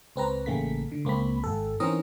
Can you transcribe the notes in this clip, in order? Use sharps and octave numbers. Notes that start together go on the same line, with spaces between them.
C#2 C4 B4 A#5
A1 C#3 A3 A#3 B6
D3
C#2 A#3 C4 B5
G#1 A4
E3 C4 C#4 D#4 A#4 D#5